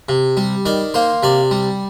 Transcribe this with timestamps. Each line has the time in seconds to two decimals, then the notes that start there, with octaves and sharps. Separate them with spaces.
0.09 C3
0.37 G3
0.65 D#3 D5
0.94 A#3 C5
1.23 C3 D5
1.51 G3